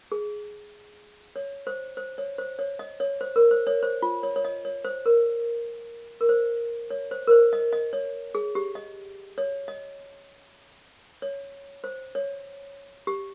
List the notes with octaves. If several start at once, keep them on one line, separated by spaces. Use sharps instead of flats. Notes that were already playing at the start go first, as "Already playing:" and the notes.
G#4
C#5
C5
C5
C#5
C5
C#5
D#5
C#5
C5
A#4
C5
C#5
C5
F4
C#5
C#5
D#5
C#5
C5
A#4
A#4
C5
C#5
C5
A#4
C5
D#5
D#5
C#5
G#4
G4
D#5
C#5
D#5
C#5
C5
C#5
G4